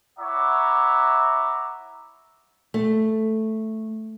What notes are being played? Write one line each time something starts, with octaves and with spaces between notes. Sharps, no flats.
E4 C#5 E5 F#5 A#5 D6
A3